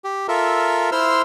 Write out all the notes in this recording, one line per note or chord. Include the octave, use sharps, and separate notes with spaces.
G4
F4 A4 A#4 E5
E4 C5 C6 E6 F6